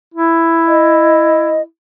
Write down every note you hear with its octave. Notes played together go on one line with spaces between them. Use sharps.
E4
D#5